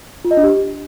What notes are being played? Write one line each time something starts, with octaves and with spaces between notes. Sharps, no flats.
F4
D#5
D4
G4